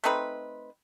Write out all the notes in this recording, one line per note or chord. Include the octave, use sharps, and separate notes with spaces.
A3 C4 D#4 B4